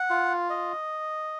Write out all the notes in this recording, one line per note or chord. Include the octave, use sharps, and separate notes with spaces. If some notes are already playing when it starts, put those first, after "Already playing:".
Already playing: F#5
F4
D#5